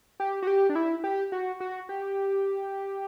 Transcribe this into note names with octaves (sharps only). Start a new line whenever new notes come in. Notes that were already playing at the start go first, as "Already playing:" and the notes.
G4
F#4
G4
D4
E4
G4
F#4
F#4
G4